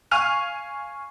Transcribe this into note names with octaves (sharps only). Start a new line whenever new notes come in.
F5 G#5 C#6 F6 D#7 F7